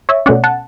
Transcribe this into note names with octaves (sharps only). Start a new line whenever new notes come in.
C#5 E5
B2 A3 C#4 D5 F#5
F#5 A5